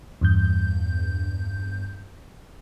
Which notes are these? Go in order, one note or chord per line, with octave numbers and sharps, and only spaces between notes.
E2 G2 G6